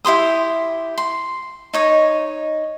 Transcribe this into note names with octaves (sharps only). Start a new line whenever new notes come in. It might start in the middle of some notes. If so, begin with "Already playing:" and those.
E4 G4 C6 D#6
C6
D#4 C#5 D#5